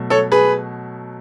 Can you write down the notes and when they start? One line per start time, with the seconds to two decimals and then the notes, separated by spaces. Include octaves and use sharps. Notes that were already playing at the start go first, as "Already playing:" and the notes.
Already playing: B2 F#3 A3
0.10 A4 C#5
0.32 G#4 B4